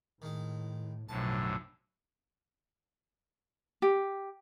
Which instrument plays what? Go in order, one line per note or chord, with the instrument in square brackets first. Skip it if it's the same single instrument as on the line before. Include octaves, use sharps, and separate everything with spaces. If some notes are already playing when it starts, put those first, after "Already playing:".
[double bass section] A2 [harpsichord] D#3 G#3
[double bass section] B1 F3 [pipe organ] F#2 A2 D3 [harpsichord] A5
[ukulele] G4